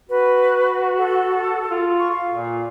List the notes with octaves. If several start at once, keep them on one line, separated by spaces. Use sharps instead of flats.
F#4 B4
A4
F4
C#6
F5
A#2